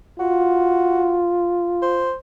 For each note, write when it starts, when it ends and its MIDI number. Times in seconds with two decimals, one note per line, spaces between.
0.20 2.12 65
0.20 1.21 66
1.82 2.14 72